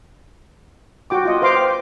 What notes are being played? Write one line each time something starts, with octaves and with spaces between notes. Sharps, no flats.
F#4 G5 D6
F4 D#5
B4 C5 F5 C6 D6
G5